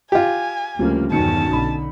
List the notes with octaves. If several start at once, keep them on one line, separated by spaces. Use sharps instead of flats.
F4 G4 G#5
D2 C#3 F3 G3 A#3
B1 E2 G2 D#3 C#4 A5 C#7
B1 D3 D#4 B5